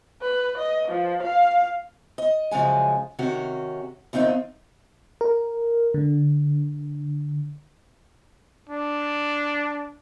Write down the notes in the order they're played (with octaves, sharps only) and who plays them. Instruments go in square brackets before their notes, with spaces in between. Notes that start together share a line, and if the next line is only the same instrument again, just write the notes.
[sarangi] B4
D#5
F3
F5
[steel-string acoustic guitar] D#5
F#2 C#3 F3 G#3 G#5
C3 D#3 C#4 F#4
E2 D#3 C4 D#4 F4
[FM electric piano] A#4
D3
[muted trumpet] D4